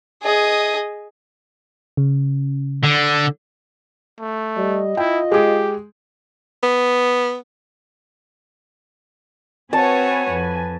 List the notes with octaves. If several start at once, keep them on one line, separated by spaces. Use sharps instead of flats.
G#4 D#5
C#3
D3
A3
G3 D#5
E4 F4 G5
G#3 G4 G#4
B3
C4 F#4 B4 C#5 G#5 A5
F2